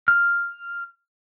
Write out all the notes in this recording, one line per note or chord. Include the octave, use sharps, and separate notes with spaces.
F6